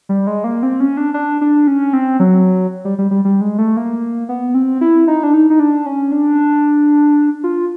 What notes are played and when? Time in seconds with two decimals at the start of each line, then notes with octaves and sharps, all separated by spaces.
0.09 G3
0.27 G#3
0.44 A#3
0.63 C4
0.80 C#4
0.97 D4
1.14 D4
1.41 D4
1.67 C#4
1.93 C4
2.20 F#3
2.85 G3
2.98 G3
3.11 G3
3.25 G3
3.41 G#3
3.58 A3
3.77 A#3
4.29 B3
4.54 C4
4.81 E4
5.07 D#4
5.23 D4
5.34 D#4
5.50 D#4
5.60 D4
5.86 C#4
6.12 D4
7.44 F4